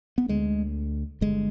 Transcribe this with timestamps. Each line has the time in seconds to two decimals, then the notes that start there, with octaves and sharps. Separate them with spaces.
0.18 B3
0.28 D2 D3 G#3
1.21 G1 G2 D3 G#3